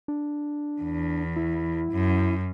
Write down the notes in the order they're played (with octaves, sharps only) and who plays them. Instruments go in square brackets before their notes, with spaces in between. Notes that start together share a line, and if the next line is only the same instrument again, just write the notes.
[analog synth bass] D4
[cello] E2
[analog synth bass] E4
[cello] F#2